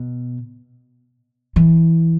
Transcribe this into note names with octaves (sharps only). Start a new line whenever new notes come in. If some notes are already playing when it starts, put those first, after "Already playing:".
Already playing: B2
E3